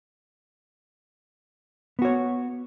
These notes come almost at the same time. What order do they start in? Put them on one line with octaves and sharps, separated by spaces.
B3 F#4 C#5